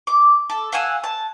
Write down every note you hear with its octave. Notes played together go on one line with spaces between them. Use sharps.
D6
A4
F5 F#5 G#5 E6
A5